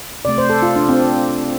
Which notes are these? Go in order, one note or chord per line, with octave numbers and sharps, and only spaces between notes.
C3 A3 D5
C5
A4
F4
D4
C4